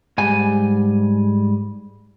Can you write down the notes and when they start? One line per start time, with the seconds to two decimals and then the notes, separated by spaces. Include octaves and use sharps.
0.18 G#2 G3 G#5